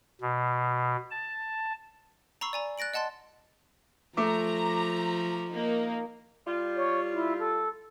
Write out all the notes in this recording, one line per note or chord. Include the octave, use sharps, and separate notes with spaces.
B2
A5
A#5 B5 C#6 E6 C7
D5 G#5 A#5
F#6 A6 A#6 D7 F#7
D#5 F#5 A5 C6 A6
F3 A3 A#5 D6
A#3 D#4
G3 F4
C#5
E4
A4